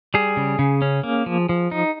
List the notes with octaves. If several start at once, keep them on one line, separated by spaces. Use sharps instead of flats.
G3 G#4
C#3
C#3
C#4
A#3
F3
F3
D#4